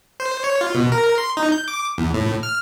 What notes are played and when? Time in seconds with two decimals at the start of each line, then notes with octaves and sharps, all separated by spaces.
0.20 C5
0.44 C#5
0.61 F4
0.75 B2
0.92 A#4
1.18 C6
1.37 D#4
1.52 G6
1.68 D6
1.98 E2
2.14 A2
2.43 F6